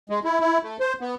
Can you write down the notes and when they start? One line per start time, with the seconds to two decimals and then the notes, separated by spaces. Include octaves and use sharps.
0.10 G#3
0.24 E4
0.40 E4
0.63 A3
0.80 C5
1.01 B3